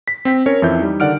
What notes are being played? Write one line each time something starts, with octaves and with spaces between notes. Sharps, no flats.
B6
C4 G5 B6
C#4 A#4 C#5
F2 E3 E5 G6
G3 D#4
D3 D#3 D5 F#5 F6 D7